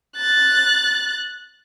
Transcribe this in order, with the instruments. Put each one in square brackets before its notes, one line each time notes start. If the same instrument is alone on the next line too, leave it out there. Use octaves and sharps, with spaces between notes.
[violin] F#6 A6